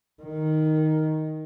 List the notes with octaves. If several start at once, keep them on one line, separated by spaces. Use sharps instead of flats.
D#3